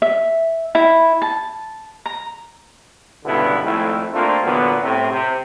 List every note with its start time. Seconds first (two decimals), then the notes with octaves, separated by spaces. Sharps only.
0.02 E5
0.75 E4
1.22 A5
2.06 A#5
3.25 C#2 G2 B2 D3 B3 E4
3.64 G#1 F2 A3 E4
4.14 A3 A#3 C4 D4 F4
4.44 E2 A#2 D3 F#3 B3
4.81 A2 C3
5.11 C3